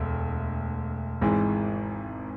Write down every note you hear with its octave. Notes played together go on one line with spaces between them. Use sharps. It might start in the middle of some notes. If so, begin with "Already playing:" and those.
Already playing: E1 D2
G#1 G#2 E3